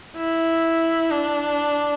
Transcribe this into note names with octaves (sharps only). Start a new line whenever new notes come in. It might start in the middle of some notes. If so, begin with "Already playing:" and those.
E4
D4